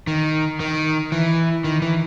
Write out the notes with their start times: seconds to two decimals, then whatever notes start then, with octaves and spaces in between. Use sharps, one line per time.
0.07 D#3
0.60 D#3
1.12 E3
1.64 D#3
1.82 E3